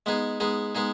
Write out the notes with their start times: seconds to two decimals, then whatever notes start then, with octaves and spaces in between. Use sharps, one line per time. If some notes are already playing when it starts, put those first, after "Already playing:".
0.06 G#3 B3 D#4 G#4
0.40 G#3 B3 D#4 G#4
0.75 G#3 B3 D#4 G#4